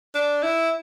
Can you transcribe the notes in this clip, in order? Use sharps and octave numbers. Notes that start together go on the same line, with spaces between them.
D4
E4